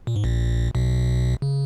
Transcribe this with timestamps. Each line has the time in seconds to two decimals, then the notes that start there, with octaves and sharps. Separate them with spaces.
0.07 A#2
0.16 G#2
0.24 A#1 A#2
0.75 B1 B2
1.42 C#3